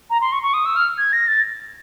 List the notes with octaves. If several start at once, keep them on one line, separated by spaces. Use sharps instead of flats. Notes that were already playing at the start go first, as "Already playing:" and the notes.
A#5
C6
C#6
C#6
D#6
E6
F6
G#6
A#6
A6